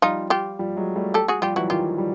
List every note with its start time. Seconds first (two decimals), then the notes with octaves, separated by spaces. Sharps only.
0.02 F3 G3 D#4 F4
0.30 F4 G4
0.59 F3 G3
0.77 F#3 G#3
0.95 G3 A3
1.14 G4 A4
1.28 F#4 G#4
1.42 F3 G3 F4 G4
1.56 E3 F#3 E4 F#4
1.69 D#3 F3 F4 G4
1.98 F3 G3